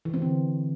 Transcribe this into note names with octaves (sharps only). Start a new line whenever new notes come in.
E3
C4
D3